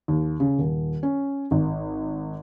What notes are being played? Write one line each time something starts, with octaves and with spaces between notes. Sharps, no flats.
D#2
C#3
D#1
C#4
G#1